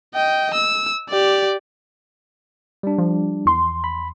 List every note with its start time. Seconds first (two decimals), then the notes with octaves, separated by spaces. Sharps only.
0.14 D#5 G5
0.54 E6
1.10 G4 D5
2.83 G3 D4
2.98 F3
3.45 E2 C6
3.84 B5